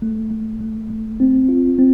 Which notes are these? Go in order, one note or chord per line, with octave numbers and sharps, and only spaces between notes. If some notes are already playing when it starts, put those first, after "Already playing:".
A3
A3
A3
A3
C4
F4
C4